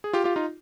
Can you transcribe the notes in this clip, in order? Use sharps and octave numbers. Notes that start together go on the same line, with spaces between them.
G#4
F4 G4
F4 G4
D#4 F4